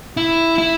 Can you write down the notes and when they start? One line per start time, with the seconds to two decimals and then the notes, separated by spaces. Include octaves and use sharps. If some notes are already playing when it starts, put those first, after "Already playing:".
0.17 E4
0.58 E4